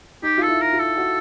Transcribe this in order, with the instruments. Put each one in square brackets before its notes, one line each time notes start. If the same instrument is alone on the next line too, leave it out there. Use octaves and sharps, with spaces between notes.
[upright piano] D#4 [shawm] G4
[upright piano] F4 [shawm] A4
[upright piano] E4
[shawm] A#4
[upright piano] F4
[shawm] A4
[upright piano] F#4